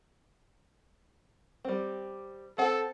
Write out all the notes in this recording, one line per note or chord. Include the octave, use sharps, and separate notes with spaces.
G3 C4
C4 A4 F#5